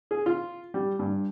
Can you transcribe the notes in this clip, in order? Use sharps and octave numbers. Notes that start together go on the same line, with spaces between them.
G#4
F4
G3
G2